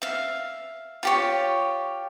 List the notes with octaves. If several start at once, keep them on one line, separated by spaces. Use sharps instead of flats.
E5 F5
F4 G4 C#5